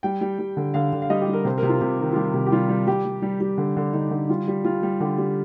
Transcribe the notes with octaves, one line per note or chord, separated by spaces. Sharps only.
G3 G5
G3
G3
D3
D3 F5
D3
F5
G3 D#5
G4
G3
A#4
C3 C5
C3 A#4
F4
C3 G4
D#3
F4
G3 G4
C3
G4
G3 F4
G3
G3 G4
G3
G3
G3
D3
D3
D3 D#4
D3
G3 F4
G3
G3 F4
G3
D3 G4
G3